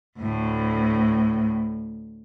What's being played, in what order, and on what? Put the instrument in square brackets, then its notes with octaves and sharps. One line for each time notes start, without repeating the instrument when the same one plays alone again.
[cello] D2 A2